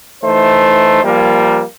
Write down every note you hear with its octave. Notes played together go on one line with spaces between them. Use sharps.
E3 A3 D#4 C5
F3 G3 A#3